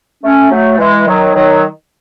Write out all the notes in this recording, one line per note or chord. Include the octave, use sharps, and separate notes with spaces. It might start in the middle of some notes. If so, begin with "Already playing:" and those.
A3 C#4
F#3 A3
E3 G#3
D#3 F#3
D#3 F#3